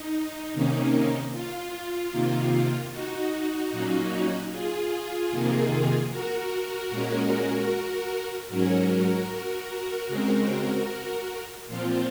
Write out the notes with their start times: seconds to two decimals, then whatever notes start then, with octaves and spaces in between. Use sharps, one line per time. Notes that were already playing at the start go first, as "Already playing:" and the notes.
Already playing: D#4
0.53 C3 D#3 A#3 C#4
1.32 F4
2.12 C3 D#3 A#3
2.91 D#4 F#4
3.71 A#2 F#3 A#3 C#4
4.51 F4 G#4
5.31 F2 C3 D#3 A#3
6.10 F#4 A#4
6.90 A#2 G#3 C#4
8.49 G#2 F#3 C#4 F#4 A#4
10.08 C#3 G#3 C4
11.67 A#2 F3 C4 F4